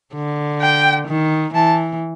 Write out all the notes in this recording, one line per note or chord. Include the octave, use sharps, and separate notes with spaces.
D3
G5
D#3
E3 A5